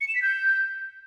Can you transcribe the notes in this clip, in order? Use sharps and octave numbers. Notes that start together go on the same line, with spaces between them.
C#7
E7
B6
G6